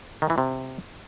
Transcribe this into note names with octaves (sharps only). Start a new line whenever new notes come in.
D#3
E3
C3